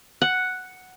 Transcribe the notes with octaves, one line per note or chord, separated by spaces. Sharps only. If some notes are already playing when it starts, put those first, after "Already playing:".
F#5